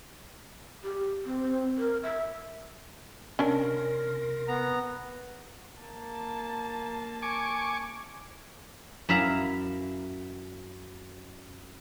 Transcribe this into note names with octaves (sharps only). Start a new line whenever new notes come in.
G4
C4
A#4
E5
C3 C#4 D4 A#4 C6 A#6
B3 A#5
A#3 A5
G#5 C#6 D6
F#2 E4 E5 F5 A#5